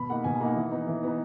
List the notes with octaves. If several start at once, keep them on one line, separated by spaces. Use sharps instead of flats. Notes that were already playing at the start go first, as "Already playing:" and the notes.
Already playing: B2 B5
A#3 D#4 F#5
B2 G#5
G#5
A#3 D#4 F#5
E3
B3 D#4
E3
B3 D#4